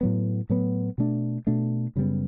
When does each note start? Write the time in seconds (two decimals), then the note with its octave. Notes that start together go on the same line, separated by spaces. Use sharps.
0.01 A2 F#3 B3
0.49 A2 F#3 B3
0.98 B2 A3 D4
1.47 B2 A3 D4
1.96 F#2 C#3 G3 B3